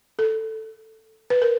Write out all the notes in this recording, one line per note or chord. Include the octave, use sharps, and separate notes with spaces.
A4
B4
A#4